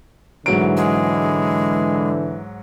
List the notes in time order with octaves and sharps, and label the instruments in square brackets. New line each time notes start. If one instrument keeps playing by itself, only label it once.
[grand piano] G#2 F#3 D7 [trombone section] D3 E3
[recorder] G#3